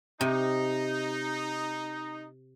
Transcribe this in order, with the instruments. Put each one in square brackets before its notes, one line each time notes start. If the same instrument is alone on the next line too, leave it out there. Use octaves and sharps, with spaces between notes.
[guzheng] C3 [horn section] D#4